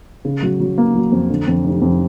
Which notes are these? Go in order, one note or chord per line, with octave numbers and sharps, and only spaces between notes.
C#3
F#3
F#3
A#3
F#3
F2
D3
F2
F1
F2